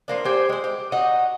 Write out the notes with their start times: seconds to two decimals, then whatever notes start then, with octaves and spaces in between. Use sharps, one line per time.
0.08 F3 A#3 D4
0.25 G4 C5 G5 G#5
0.49 G#3 C5
0.64 G4
0.92 D#4 F#4 D#5